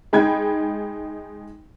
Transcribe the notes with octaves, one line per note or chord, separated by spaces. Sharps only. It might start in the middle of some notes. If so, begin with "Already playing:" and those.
G#3 D#4 G5 B5 G#6